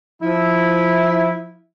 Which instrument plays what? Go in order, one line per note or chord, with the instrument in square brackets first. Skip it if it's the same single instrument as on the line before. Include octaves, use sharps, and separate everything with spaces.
[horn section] F3 E4